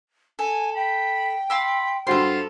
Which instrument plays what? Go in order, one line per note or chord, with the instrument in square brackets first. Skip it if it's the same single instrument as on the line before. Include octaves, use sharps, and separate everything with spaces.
[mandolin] A4 [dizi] G#5
[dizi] G5 [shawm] B5
[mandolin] F5 C6 E6 [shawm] B5
[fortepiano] G2 F#4 C5 [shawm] F4 [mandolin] A4 C6